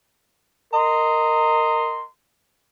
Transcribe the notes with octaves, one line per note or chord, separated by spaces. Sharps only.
A#4 D#5 A#5 C6